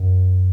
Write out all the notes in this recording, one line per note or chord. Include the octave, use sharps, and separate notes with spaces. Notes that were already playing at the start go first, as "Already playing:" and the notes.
Already playing: F#2